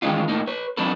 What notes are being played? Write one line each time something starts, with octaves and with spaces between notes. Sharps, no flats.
D#3 E3 G#3 C#4 D#4 F4
A2 A#3 D#4
B4 C#5
F#3 C4 D4 D#4 A4 B4